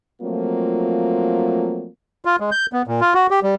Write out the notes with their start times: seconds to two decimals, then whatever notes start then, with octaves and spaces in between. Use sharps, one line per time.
0.21 F3 F#3 A3 A#3 C4 F4
2.25 F4
2.40 G#3
2.51 G6
2.73 B3
2.87 A#2
3.01 F4
3.14 F#4
3.31 G4
3.43 G3